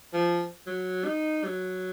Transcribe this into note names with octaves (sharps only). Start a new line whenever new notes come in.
F3
F#3
D#4
F#3